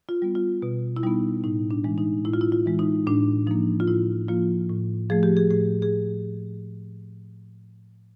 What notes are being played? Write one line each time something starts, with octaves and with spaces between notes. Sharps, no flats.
F4
G3 B3
F4
B2
E4
G3 B3 D#4
A2 D#4
D4
E3 G#3
D#4
A2 E4
F4
E4
F4
E3 G#3
D#4
A2 D4
F3 A#3 D#4
F4
A2 E4
F3 A#3 F4
A2
F3 A3 G#4
G4
G#4
A2 G#4
G#4